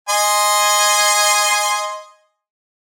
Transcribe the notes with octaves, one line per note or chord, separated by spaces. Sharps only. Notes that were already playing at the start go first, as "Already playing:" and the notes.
D#5 G#5 C6